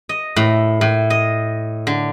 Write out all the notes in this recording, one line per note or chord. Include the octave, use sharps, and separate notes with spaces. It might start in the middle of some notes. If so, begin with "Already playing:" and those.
D#5
A2
A2
D#5
D3